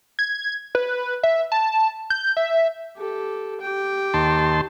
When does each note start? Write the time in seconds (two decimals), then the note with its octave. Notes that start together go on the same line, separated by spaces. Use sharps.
0.19 G#6
0.75 B4
1.23 E5
1.52 A5
2.10 G6
2.37 E5
2.97 G4 A4
3.61 G4 G5
4.14 D#2 A5 C6